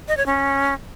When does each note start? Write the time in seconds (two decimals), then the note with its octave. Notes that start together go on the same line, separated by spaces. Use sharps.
0.08 D#5
0.17 C#5
0.26 C#4